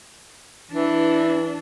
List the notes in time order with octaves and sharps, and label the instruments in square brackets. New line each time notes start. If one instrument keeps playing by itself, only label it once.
[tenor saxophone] E3 [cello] D4